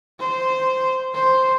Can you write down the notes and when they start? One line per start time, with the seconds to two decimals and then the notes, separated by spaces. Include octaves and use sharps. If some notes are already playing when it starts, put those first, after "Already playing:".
0.20 C5
1.14 C5